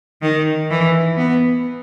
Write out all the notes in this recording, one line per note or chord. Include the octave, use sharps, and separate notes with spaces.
D#3
E3
B3